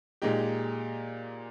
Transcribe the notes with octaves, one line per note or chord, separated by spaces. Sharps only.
A#2 G#3 D#4 G4